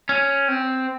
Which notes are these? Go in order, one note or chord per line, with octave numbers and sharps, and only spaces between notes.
C#4
C4